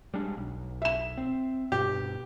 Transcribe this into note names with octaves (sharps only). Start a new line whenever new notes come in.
G3 G#3 D4
B1
E5 E7
C4
G2 B2 G4